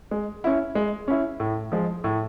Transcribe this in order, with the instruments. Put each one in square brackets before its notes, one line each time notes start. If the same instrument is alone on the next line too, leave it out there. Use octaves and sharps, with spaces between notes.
[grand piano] G#3
C#4 E4
G#3
C#4 E4
A2
F3 G#3
A2